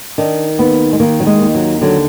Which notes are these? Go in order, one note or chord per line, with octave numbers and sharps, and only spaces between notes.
D#3 D4
D#2 B3
G#3
D#3 A#3
F#3
G#3
D#2
F#3
D3 F#3